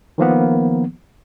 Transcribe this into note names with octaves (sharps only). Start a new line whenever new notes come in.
D#3 F3 A#3 B3